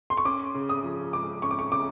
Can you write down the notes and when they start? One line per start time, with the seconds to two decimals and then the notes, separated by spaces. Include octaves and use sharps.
0.10 C6
0.17 C#6
0.25 C#4 D6
0.55 C#3
0.69 D#6
0.84 F3
1.13 G#3 D6
1.42 C#4 C#6
1.51 D6
1.59 C#6
1.72 C#3 D6